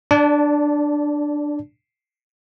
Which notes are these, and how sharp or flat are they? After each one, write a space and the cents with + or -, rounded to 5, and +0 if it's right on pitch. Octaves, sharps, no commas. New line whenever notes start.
D4 +10 D5 -20 A5 -15